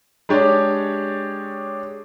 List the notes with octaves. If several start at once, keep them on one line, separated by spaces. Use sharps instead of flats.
G#3 D4 G4 C#5 D5